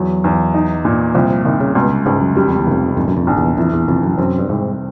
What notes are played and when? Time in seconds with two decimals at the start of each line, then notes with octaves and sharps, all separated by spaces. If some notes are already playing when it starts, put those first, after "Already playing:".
Already playing: E2 F#3
0.24 E2
0.54 D#4
0.85 A#2
1.15 C2 F3
1.30 F3
1.45 C2 D#3
1.61 C#3
1.75 C#2 B2
2.06 C#2 G#2
2.21 F#2
2.36 F#2 G3
2.48 F2
2.60 E2
2.67 F1 F2
2.96 A#1 F2
3.08 F#2
3.17 F2
3.27 A#1
3.37 E2
3.57 F2 E3
3.73 E2
3.88 F1 F2
4.03 F#2
4.18 F#2 C4
4.38 G2
4.49 C2 G#2